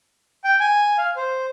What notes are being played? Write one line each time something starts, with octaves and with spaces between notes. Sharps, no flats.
G5
G#5
F5
C5